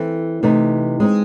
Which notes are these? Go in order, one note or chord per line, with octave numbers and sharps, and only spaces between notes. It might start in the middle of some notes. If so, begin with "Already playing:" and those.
Already playing: E3 C4 E4 A4
C3 E3 A3 D#4
G#3 C4 D#4